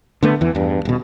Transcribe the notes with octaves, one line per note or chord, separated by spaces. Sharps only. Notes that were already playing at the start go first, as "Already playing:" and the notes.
D3 A3 B3
E2 E3
E2 G2
D#1 B2